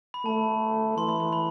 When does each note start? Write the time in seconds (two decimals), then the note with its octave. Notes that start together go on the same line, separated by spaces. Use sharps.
0.14 B5
0.25 A3 A5
0.97 E3 C6
1.09 B5
1.20 C6
1.33 B5